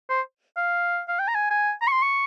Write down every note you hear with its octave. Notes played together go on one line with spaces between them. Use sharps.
C5
F5
F5
G5
A#5
G#5
G#5
A#5
C#6
C6
C#6